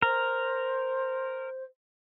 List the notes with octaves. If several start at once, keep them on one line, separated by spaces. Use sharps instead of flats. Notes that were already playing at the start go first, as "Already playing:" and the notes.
A#4 C5